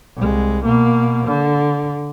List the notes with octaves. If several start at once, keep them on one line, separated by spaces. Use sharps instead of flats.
C2 G#3
B2 A#3
D3